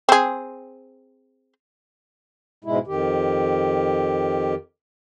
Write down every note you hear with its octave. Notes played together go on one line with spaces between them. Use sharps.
C4 G#4
G#2 B2 G#3 E4
F2 D#3 G4